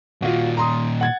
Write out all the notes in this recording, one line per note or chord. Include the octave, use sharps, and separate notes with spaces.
A#2 D#3 F4 F#4
A#5 C6 D#6
F#5 G#6 A6